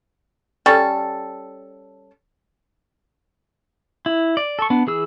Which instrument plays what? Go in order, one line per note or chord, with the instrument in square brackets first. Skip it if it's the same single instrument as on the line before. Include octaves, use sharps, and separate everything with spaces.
[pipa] G3 C#4 A4
[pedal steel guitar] E4
D5
A4 C#6
B3 D4
E3 G#4 E6